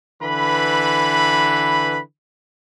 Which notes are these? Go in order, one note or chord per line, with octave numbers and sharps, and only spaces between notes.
D3 E3 B4 B5